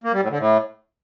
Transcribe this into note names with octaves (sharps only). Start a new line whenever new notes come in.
A#3
G3
A2
D3
A2